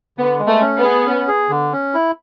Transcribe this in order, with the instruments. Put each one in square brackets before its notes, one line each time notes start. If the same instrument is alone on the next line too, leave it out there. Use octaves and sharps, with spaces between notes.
[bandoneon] D3 [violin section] B3
[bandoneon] G#3
[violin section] A3
[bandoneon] C#4
[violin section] B3
[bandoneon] G#4
C#4
G#4
D3
C#4
E4